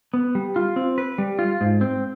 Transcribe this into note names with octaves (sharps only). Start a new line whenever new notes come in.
B3
G3
F4
C4
B4
G3
F4
G#2
C4